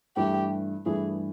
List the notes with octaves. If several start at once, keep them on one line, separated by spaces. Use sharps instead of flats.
G2 E3 A3 G4
G2 E3 A3 G#4